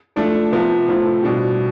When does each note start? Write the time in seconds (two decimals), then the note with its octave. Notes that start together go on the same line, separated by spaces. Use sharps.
0.16 F3 A3 D4 A4
0.52 C3 F3 B3
0.88 A2 F3 A3 C4
1.23 B2 G3 D4 G4